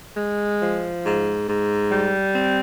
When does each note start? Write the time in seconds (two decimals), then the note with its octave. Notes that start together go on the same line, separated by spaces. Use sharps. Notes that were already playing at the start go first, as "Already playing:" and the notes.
0.17 G#3
0.61 F3
1.04 G#2
1.48 G#2
1.91 G3
2.35 C4